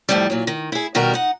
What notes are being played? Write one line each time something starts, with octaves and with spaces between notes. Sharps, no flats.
F2 A2 C3 E3 G3
A#2 F#3
D#3
E4 G#4
B2 D#3 G3 F#4 G4 A#4
D#4 F#5